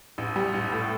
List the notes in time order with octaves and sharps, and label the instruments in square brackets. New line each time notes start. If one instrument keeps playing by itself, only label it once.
[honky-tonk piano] A1
G3
A1
A2